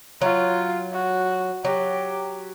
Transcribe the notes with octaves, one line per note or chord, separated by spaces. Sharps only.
F#3 F4
F#4
F#3 G4